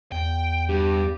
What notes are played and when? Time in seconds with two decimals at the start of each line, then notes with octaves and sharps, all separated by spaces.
0.12 E2 G5
0.69 G2 G4